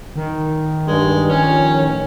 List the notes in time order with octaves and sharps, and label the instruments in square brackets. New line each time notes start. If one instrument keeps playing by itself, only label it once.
[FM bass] D#3
[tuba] G2 [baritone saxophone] G#3
[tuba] F3 [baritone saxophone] C#4 [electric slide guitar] C#5
[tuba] A1